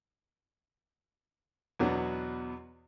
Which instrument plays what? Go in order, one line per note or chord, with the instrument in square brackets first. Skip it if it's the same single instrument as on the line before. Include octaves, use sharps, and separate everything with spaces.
[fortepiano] E2 B2 F#3 B3 D4